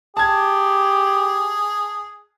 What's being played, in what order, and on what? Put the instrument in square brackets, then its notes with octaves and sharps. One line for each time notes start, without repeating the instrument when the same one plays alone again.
[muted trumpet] G4 [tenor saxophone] G#4 [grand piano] A5 G#6